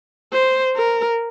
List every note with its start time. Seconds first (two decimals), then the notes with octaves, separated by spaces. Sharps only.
0.33 C5
0.76 A#4